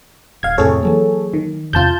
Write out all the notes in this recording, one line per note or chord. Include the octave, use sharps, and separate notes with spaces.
D1 F5 G#6
F2 A2 C3 G#4 A4 C#5
E3 F#3 A#3
D#3
E2 C3 F4 A5 G6